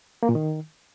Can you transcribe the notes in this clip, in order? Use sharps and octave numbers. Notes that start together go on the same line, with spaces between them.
A#3
A#2
D#3